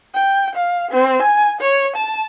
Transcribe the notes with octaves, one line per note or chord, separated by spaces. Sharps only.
G5
F5
C4
G#5
C#5
A5